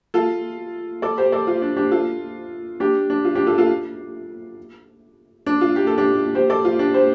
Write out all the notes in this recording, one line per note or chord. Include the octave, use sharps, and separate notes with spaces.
F4 A4
A4 D5
G4 C5
A4 D5
F4
D4
D4 G4
F4 A4
D4 G4
D4
F4
D4 G4
F4 A4
F4 A4
D4
F4
G4
A4
D4 G4
G4 C5
A4 D5
F4
D4 G4
G4 C5